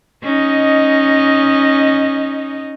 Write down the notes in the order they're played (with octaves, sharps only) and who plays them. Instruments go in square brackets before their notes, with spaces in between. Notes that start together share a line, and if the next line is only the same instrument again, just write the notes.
[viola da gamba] C#4 D#4 D#5